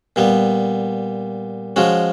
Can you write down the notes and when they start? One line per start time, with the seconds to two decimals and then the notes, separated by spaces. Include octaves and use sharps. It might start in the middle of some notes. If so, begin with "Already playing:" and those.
0.16 A#2 G3 B3
1.76 F3 G#3 C#4 F#4